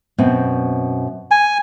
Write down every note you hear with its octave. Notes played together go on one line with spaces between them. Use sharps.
F#2 B2 C4
G#5